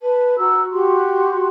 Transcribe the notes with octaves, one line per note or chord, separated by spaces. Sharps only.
B4 A5
F#4 A#5 E6
F#4 G4 C6